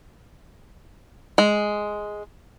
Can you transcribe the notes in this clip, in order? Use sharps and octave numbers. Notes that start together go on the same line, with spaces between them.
G#3